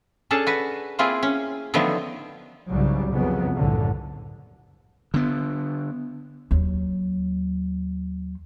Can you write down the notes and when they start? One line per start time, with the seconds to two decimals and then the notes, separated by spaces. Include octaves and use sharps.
0.31 C#4 D4 G#4 A4 A5
0.47 F#4 B4
0.99 A#3 C4 E4 F4 G#4
1.23 C#4
1.74 D3 D#3 F3 F#3 A3 B3
2.68 C2 G#2 C#3 F#3 G3
3.10 F2 C#3 F#3 B3
3.53 C2 F#2 A2 D3
5.14 D3 B3
6.51 D#2 F#3